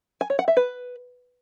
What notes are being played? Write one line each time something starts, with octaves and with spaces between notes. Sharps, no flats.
G#5
C#5
F#5
E5
B4